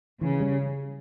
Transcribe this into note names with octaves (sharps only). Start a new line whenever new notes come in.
C#3 E3
G3 C#4